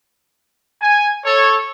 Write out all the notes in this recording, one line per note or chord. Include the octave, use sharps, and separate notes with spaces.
G#5
A4 C#5